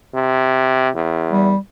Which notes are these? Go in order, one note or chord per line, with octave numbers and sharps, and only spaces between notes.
C3
E2
G3